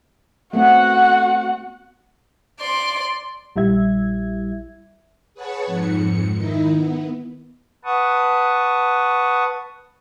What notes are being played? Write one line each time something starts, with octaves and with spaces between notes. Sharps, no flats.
A3 B3 C4 F#4 F#5
D5 C6
A#1 G3 E4 E5 G#6
G#4 B4 C#5 F#5 A5 C#6
F2 G#2 C#7
D#3 D#4 E4
B3
B4 F#5 A5 C#6 D#6